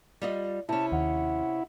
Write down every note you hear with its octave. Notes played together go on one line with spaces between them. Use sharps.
G3 F4 D#5
C3 C#4 E4 A5
D#2 F#5